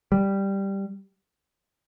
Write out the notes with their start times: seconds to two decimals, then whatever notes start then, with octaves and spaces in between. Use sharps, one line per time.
0.12 G3